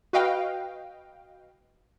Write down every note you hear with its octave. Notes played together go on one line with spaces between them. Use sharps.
F#4 B4 D#5 F5 G5